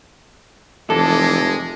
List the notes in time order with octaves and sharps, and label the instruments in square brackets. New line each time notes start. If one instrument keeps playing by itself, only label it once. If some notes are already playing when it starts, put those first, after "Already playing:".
[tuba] F1 [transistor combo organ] E3 A5 D6 [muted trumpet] G#3 [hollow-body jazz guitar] A4